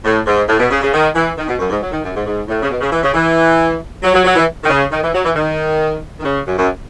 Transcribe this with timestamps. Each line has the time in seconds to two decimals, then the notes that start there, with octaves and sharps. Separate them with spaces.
0.04 A2
0.26 G#2
0.49 A2
0.60 B2
0.70 C#3
0.81 C#3
0.92 D#3
1.15 E3
1.37 D#3
1.48 B2
1.59 F#2
1.70 G#2
1.81 F#3
1.92 D#3
2.03 F#2
2.14 G#2
2.26 G#2
2.48 A2
2.62 C#3
2.70 B2
2.80 C#3
2.92 E3
3.03 C#3
3.14 E3
4.03 F#3
4.14 F#3
4.25 F#3
4.36 E3
4.64 D#3
4.69 C#3
4.92 D#3
5.02 E3
5.14 F#3
5.24 E3
5.35 D#3
6.20 D#3
6.23 C#3
6.46 F#2
6.57 F#2